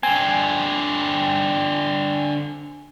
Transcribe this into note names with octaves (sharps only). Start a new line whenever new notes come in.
D3 C4 G#5